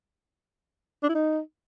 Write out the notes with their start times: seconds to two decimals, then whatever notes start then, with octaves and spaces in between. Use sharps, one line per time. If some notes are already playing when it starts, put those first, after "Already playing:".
1.03 D4
1.09 E4
1.14 D#4